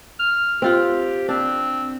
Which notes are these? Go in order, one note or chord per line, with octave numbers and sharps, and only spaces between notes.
F6
C4 F4 G4 F#5
C4 D4